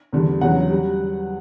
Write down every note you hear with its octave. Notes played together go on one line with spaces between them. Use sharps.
E2 D3 G3
E2 C#3 F#3 F#5
G3